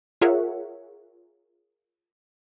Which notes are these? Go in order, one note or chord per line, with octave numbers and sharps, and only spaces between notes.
F4 G#4 A#4 C#5 E5 F#5